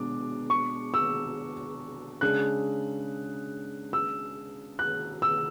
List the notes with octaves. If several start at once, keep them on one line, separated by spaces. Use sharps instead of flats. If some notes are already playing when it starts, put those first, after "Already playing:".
Already playing: B2 G#3 D4 D6
C#6
E6
C#3 G#3 D4 G#4 F#6
E6
F#6
E6